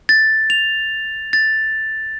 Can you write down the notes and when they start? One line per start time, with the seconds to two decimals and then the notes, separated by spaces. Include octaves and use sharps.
0.09 A6
0.50 F7
1.33 A6